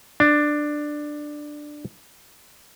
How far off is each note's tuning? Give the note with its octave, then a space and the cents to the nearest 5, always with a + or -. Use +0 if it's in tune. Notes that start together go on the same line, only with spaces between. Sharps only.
D4 +10